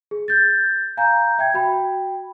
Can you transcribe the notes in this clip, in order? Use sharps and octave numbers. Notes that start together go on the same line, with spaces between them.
G#4
G6 A6
F5 G#5 A#5 G6
E5 G5 G#6
F#4 G5 B5